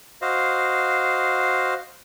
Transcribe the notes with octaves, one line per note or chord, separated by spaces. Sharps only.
F#4 C5 D#5 F5